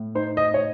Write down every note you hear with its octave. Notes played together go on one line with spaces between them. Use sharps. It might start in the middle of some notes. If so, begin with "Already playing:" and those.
Already playing: A2
D#4 C5
D#5
C#5